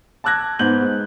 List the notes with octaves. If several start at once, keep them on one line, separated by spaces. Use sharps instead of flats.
A5 D6 E6 F#6 G#6 A#6
G#2 B3 C5 G6 F#7
G#3